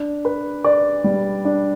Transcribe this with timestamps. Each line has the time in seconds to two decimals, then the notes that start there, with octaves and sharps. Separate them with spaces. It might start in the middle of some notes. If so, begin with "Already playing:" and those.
Already playing: D4
0.25 B4
0.64 D5
1.04 G3
1.45 D4